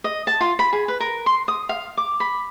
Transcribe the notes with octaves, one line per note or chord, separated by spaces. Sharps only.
D#5
A5
F4
B5
G#4
B4
A#4
C6
D#6
F5
D6
B5